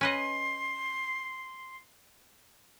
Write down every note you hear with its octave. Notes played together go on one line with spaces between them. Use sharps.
C#4 B4 D#5 C6